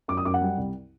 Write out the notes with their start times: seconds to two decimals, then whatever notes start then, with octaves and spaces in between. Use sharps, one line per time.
0.08 F#2 D6
0.17 D#6
0.25 F#2 D6
0.34 F#5
0.41 G3
0.58 C2